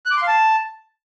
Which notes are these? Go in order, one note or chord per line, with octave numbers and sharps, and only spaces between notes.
F#6
D6
C6
F5
A5